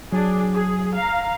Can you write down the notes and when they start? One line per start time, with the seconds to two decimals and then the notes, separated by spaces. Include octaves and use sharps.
0.13 F#3 D4 G#4
0.54 G#4
0.94 F5 A#5